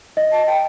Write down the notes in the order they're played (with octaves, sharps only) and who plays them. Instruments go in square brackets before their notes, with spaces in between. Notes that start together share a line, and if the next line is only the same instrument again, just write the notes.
[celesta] D#5
[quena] A5
G5